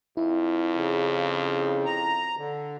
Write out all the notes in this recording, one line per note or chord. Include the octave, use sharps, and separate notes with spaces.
F2 E4
C#3
A#5
D3